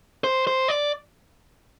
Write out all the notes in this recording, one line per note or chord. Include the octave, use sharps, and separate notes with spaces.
C5
C5
D5